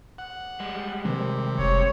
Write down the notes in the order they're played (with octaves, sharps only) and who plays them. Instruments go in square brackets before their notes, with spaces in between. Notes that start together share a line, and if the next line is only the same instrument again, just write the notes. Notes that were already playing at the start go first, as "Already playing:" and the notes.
[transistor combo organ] F#5
[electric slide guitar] G3 G#3
[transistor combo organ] C3 [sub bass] D#3
[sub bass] F1 [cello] C#5